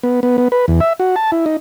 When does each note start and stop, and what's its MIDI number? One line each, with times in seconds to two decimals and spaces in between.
0.03 0.20 59
0.23 0.37 59
0.38 0.48 59
0.52 0.66 71
0.68 0.80 40
0.81 0.93 76
1.00 1.15 66
1.16 1.31 81
1.32 1.45 64
1.46 1.57 63